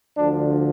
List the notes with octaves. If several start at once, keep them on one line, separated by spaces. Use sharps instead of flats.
D2 D3 F3 D4